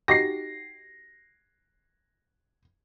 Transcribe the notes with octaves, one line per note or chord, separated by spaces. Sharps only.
D#4 F#4 G4 A#6 C7